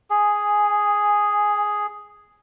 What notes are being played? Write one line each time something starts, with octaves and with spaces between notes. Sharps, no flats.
G#4 G#5